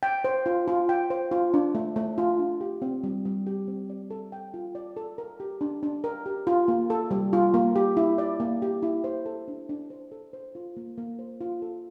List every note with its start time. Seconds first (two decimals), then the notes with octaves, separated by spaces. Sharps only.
0.03 G5
0.24 C5
0.46 F4
0.68 F4
0.89 G5
1.10 C5
1.31 F4
1.54 D4
1.75 A3
1.96 A3
2.18 F4
2.39 D4
2.61 G4
2.82 C4
3.04 G3
3.25 G3
3.47 G4
3.68 C4
3.90 D5
4.11 A4
4.32 G5
4.54 F4
4.75 D5
4.97 A4
5.18 A#4
5.40 G4
5.61 D4
5.83 D4
6.04 A#4
6.26 G4
6.47 F4
6.68 A#3
6.90 A4
7.11 G3
7.33 F4
7.54 A#3
7.76 G4
7.97 E4
8.18 D5
8.40 A#3
8.62 G4
8.83 E4
9.04 C5
9.26 A4
9.48 D4
9.69 D4
9.90 C5
10.12 A4
10.33 C5
10.55 F4
10.77 A#3
10.98 A#3
11.19 C5
11.41 F4
11.62 A4